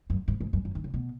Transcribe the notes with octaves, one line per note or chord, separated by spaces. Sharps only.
F#2
G#2
G#2
F#2
F#2
D#3
C#3
B2